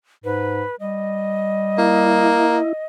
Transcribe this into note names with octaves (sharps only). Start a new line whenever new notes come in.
G#2 B4
G3 D#5
A#3 E4